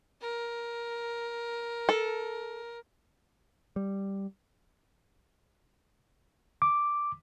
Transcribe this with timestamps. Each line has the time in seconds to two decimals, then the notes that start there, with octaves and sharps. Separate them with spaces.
0.21 A#4
1.89 A4
3.76 G3
6.62 D6